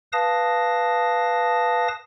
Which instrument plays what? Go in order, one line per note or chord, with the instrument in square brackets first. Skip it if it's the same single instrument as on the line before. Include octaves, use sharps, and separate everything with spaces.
[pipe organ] B4 F5 A5 D#6 A#6